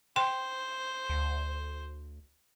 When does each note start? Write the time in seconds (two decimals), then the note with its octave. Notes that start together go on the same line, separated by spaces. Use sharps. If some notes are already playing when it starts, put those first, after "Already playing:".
0.16 C5 G5 C6
1.10 D2